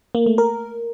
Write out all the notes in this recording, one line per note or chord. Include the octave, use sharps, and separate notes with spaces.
A#3
A3
A#4